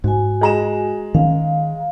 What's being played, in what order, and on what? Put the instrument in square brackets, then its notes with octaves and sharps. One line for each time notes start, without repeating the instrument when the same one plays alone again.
[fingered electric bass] G#2 [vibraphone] F#4 G#5
[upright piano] G#3 A#5 E7
[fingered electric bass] D#3 C4 C#4 [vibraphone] F5